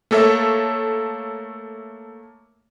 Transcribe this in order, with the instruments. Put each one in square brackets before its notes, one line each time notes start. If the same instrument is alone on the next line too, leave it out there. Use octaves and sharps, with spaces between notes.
[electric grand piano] A3 A#3 A4 C#5 E5